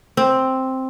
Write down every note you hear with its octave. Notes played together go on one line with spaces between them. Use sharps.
C4